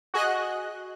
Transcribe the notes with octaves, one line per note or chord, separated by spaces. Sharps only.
F#4 G#4 D#5 F#6